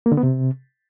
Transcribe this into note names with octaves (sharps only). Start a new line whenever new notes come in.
A#3
D3
B3
C3